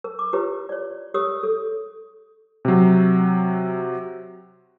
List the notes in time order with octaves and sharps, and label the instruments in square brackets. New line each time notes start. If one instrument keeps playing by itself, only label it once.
[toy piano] A#4
D6
E4 F4 G4 A#4 B4 C#5
C#5 D5
G4 A#4 C#5 D#6 E6
A4
[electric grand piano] C3 F#3